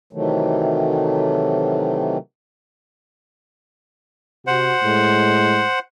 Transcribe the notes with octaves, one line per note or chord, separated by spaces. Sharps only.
C3 D#3 E3 F#3 A3
C3 F#4 C5 F#5
A2 G#3